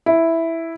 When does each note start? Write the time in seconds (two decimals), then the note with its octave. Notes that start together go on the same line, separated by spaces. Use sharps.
0.06 E4